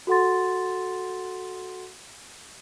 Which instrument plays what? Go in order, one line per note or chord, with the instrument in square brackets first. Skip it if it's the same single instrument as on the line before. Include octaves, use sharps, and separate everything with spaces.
[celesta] F#4 A4 F#5 C6 A6